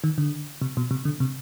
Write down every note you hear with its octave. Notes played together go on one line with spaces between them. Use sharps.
D#3
D3
C3
B2
C3
D3
C3